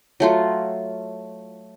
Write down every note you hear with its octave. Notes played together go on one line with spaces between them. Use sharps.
F#3 A3 F4